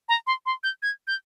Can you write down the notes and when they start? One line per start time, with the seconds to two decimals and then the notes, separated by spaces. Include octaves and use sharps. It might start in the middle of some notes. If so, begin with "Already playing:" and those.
0.09 A#5
0.27 C6
0.46 C6
0.63 G6
0.82 G#6
1.07 G6